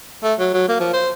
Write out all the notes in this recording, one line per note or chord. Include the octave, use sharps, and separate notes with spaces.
A3
F#3
F#3
A#3
F3
C5